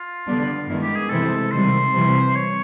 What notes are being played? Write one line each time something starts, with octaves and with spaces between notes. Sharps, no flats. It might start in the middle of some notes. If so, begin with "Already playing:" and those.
Already playing: F4
D3 G3 B3 D4
G2 D#3 G#3 B3 E4
G4
G#4
C3 E3 G#3 C4 E4 A4
C3 D#3 G3 C5
C3 E3 G3
C#5